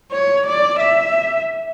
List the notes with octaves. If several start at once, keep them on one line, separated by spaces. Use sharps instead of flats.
C#5
D5
E5